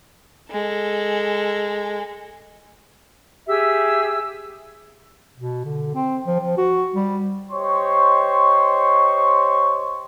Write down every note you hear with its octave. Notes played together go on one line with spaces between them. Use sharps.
G#3 A4
G4 G#4 E5 E6
B2
D3
C4
F3
F3
F#4
G3
G4 C5 C#5 D#5 C6 C#6